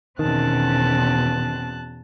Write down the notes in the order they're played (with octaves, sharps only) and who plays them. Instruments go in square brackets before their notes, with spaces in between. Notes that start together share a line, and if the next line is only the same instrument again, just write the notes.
[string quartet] E2 A5 F#6 [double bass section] B2 [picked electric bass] D#3 [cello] C4 C#4